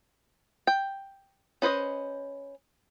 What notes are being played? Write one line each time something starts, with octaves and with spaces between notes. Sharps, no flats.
G5
C#4 B4 C5 D#5